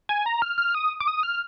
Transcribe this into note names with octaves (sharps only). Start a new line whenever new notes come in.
G#5
A#5
F6
F6
D#6
D6
D#6
F6